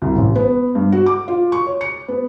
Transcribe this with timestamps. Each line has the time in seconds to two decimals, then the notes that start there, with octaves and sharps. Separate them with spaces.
0.02 C2
0.16 A1
0.35 B3
0.75 G2
0.92 F#4
1.06 D6
1.28 F4
1.52 C#6
1.67 C#5
1.81 C#7
2.08 B3